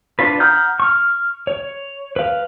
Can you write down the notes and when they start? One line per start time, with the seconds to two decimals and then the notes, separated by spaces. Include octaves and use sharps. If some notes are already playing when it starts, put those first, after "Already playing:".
0.19 D4 F4 B4
0.40 F#5 A#5 D#6 F6 G6
0.80 C#6 F6
1.47 C#5
2.16 B4 F5